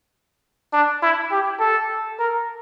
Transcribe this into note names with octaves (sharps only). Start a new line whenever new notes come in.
D4
E4
G4
A4
A#4